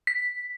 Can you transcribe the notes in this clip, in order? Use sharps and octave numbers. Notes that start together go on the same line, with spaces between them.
B6